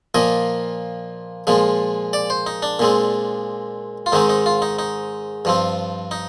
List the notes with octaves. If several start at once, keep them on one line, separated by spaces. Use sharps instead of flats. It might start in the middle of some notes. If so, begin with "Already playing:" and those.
A#2 F3 A#3 D#5
A#2 F3 G#3
D5
C5
D#4
D4
A#2 G#3 C4
F4
G#2 D#3 G#3 C4 D#4
D#4
F4
D#4
D#4
G2 F3 C4
D#4